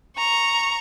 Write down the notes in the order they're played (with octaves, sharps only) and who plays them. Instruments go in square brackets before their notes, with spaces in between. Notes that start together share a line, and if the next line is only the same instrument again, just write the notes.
[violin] A#5 C#6